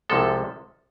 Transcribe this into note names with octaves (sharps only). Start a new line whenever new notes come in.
C2 C3 F3 G#3 A4